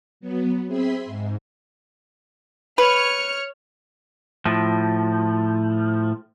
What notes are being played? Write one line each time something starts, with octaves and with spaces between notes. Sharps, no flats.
F#3 B3
C4 G#4 E5 B5 C6 B6
G#2
B4 C#5 F6 C#7
A2 F3